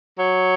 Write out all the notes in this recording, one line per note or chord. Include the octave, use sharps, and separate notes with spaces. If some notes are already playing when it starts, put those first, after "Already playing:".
F#3